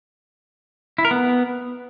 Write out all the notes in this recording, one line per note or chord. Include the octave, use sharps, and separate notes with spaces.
E4
A#4
B3